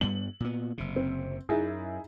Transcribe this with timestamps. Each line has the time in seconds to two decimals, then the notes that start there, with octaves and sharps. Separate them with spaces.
0.01 G2 G3 B3 F#7
0.40 A#2 B3
0.78 F#1 C3
0.96 C4
1.49 F#2 D#4 E4 G#4